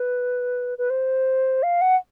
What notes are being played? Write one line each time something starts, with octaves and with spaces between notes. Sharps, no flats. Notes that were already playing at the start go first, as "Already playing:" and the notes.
Already playing: B4
B4
C5
F5
F#5